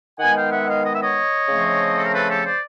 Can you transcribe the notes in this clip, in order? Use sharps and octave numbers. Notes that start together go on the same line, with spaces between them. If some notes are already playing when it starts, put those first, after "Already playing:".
D#3 G#3 B3 F#5 G#5
F5 G5
E5 F#5
D#5 F5
D#5
E5
C#5 D#5
C#3 F3 A3 C4
A4
A#4
A4 B4
G4 A4
C5 D5